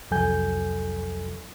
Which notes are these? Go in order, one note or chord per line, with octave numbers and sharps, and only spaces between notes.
C2 F2 F#3 A4 G#5 G6